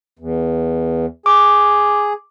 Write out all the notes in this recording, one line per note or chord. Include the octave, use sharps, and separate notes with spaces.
E2
G#4 D6